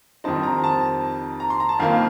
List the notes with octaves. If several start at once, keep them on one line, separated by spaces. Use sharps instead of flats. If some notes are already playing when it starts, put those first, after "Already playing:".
F2 D#3 G3 C4 D#4 A5
A#5
A5
A#5
C6
A#5
A5
F2 D#3 A#3 F5